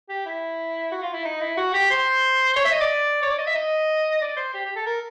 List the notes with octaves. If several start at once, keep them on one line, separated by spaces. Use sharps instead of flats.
G4
E4
F#4
F4
E4
D#4
E4
F#4
G4
C5
C#5
E5
D#5
D5
C#5
D5
D#5
E5
D#5
D5
C5
G4
G4
A4
A#4